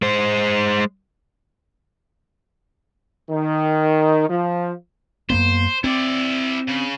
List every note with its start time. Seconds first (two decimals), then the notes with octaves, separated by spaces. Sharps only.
0.02 G#3 C5
3.30 D#3
4.28 F3
5.30 F#2 A#3 B3 C5
5.84 C4 E4 D5
6.69 C#3